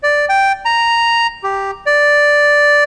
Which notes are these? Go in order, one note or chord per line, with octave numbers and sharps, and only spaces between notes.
D5
G5
A#5
G4
D5